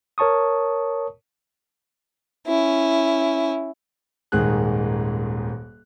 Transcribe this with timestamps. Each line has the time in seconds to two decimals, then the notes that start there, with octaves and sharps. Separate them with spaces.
0.18 A#4 C#5 A5 C#6 D#6
2.47 C#4 E4
4.32 D#1 G#2 D#3 G#4 F#6